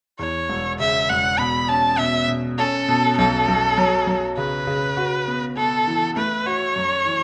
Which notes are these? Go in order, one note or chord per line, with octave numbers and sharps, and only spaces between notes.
E2 C#5
E1
C#3 E5
E1 F#5
B2 B5
C#4 A5
B2 E5
B2
C#4 A4
B2
B1 A4
B1
F#3
F#3
C#3 B4
C#3
F#4
B3
B3 A4
E3
A3 B4
F#4 C#5
F#2
E3